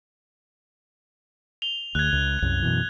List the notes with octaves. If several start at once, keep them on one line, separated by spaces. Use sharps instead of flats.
F7 G7
D2 F#6 G#6
C#2
C2 F#2
F#2 B2 E3